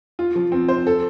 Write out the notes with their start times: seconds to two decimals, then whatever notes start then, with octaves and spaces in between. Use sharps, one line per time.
0.19 F4
0.35 F3
0.52 C4
0.68 C5
0.87 A4